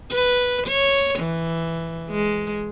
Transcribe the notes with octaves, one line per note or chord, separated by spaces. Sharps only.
B4
C#5
E3
G#3